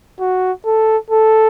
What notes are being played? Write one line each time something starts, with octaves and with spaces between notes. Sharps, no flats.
F#4
A4
A4